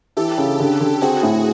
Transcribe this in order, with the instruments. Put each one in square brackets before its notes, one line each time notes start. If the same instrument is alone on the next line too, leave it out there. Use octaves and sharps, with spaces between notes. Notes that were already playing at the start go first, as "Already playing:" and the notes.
[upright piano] E3 [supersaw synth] G4 A4
[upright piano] C#3
D3
D3
[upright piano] C4 [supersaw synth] F#4 G#4
[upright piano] A2